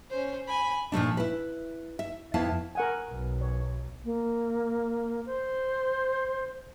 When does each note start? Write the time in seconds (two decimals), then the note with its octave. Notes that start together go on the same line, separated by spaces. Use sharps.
0.10 C#4 C5
0.47 G#5 B5
0.92 A#2 F3 A3 D4
1.17 E4 B4
1.99 E5
2.34 F2 B3 E4 F5 A5
2.75 A#4 F#5 G#5
3.10 B1
3.41 C#5
4.05 A#3
5.26 C5